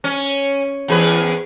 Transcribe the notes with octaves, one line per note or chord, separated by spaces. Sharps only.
C#4
E2 G#4 B4